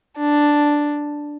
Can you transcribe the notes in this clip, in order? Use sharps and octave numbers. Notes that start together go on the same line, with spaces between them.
D4